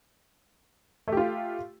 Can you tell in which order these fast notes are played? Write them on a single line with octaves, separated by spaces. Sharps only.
A3 G4 F4